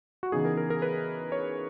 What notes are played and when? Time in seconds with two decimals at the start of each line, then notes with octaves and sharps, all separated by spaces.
0.23 F#4
0.32 C#3 E3 B3 D#4 G#4
0.45 A#4
0.57 A#4
0.70 A#4
0.82 B4
1.32 C#5